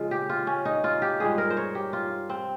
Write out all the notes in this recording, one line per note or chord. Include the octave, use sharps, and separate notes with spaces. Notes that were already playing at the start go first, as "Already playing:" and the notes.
Already playing: C#3 F3 G#3 F4
G4
F4
C#4
D#4
F4
G4
G2 F3 G#3 G#4
A#4
C5
C#5
G4
F4
C4